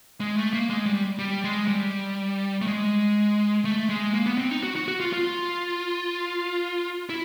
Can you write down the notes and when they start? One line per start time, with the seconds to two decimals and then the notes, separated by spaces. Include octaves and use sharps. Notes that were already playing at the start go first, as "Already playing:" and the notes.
0.20 G#3
0.37 A3
0.53 A#3
0.70 G#3
0.86 G3
1.19 G3
1.44 G#3
1.68 G3
2.62 A3
2.67 G#3
3.65 A3
3.89 G#3
4.14 A#3
4.26 B3
4.38 C4
4.51 D#4
4.63 F#4
4.75 F#4
4.88 F#4
5.00 F4
5.13 F4
7.09 E4